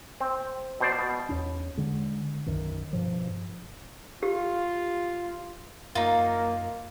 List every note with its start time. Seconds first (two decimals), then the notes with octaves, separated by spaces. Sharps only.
0.21 C4
0.80 B2 C5 D5
0.99 B2
1.29 E2 C#4
1.77 D3 G#3
2.46 B1 F#2 D#3
2.93 G2 B2 F3
4.23 F4 G4
5.95 F#2 A#3 D#4 F4